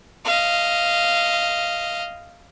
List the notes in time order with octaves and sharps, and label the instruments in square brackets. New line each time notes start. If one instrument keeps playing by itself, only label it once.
[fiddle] D#5 F5